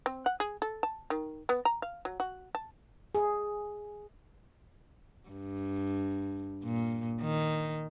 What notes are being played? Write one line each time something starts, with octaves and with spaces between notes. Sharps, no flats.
C4
F#5
G#4
A4
A5
D#3
B3
A#5
F5
F#3
F#4
A5
G#4
G2
A#2
D#3